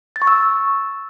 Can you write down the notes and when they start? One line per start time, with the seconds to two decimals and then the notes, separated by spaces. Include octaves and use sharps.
0.16 A6
0.22 C#6
0.27 E6